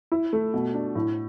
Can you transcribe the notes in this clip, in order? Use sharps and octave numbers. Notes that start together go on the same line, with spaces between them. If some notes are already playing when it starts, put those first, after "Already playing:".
E4
A3
B2
D4
A2